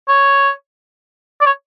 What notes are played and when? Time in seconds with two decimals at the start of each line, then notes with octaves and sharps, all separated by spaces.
0.08 C#5
1.41 D5
1.46 C#5